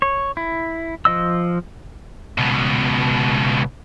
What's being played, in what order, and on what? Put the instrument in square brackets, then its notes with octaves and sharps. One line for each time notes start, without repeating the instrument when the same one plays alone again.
[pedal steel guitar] C#5
E4
F3 D#5 E6
[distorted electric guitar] C#2 B2